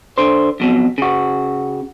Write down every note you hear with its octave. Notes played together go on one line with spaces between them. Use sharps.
D3 C5
F2 B2 F#3
C#3 F#4